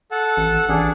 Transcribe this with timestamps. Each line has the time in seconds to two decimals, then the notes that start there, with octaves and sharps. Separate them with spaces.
0.12 A4 F#5 A5
0.37 A1
0.69 A1 D4 G#4